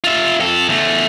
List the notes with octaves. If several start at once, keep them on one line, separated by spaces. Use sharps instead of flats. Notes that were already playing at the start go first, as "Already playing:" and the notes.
F4 E5
F2 A4
E2 A3